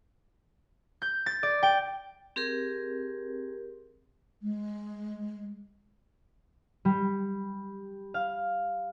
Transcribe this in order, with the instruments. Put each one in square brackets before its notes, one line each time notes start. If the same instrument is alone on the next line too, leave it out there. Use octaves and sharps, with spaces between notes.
[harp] G6
A6
D5
G5
[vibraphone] C4 G4 G#4 A#4
[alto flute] G#3
[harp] G3
F5